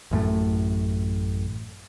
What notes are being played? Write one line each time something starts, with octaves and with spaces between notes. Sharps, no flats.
A1 F#2 A2 A3